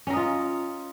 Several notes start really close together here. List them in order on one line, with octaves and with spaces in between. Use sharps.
C#4 A#4 D#5 F4